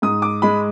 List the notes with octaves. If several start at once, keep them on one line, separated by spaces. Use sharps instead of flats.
G#2 D#6
D6
G#3 B5